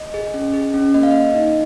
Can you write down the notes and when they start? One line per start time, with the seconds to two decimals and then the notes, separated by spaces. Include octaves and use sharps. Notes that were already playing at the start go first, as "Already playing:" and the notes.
Already playing: D#5
0.14 G#4
0.34 C#4
0.54 G#4
0.74 C#4
0.94 A#3 D#5
1.03 F5
1.11 A#3 D#5
1.35 D#4